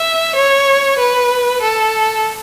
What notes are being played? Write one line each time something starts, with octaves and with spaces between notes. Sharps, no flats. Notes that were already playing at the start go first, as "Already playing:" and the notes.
Already playing: E5
C#5
B4
A4